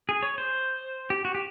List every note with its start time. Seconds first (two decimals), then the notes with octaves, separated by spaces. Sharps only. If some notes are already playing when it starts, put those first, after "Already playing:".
0.09 G#4
0.23 C#5
0.38 C5
1.10 G4
1.25 F#4
1.35 G4